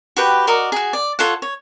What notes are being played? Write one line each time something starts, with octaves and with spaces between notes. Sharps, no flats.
F#4 G4 B4 G5
F#4 A#4 D5 D#5
F#4 G#4
D5
F4 A4 C#5 F#5
C#5